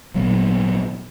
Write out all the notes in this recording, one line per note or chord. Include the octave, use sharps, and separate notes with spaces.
G#1 A#2 F#3 B3